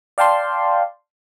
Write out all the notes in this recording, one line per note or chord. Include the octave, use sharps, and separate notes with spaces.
D5 F5 G5 A5 C6